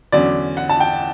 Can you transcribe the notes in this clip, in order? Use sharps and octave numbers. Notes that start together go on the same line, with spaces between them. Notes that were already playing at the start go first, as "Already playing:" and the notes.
E2 D3 F#3 C#4 D5
F#5
A5
G5